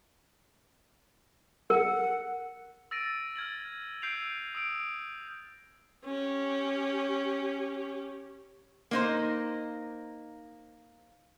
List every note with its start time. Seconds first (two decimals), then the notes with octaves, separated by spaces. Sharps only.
1.70 A#4 F#5
2.91 E6 A6 A#6 D7 D#7
3.36 F6 G#6 A6 F#7
4.02 E6 G6 C7 D7 D#7 F7
4.55 D#6 E6 D7
6.05 C#4 G4
8.91 A#3 D#4 C5